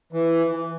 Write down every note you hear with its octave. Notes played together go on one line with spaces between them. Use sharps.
E3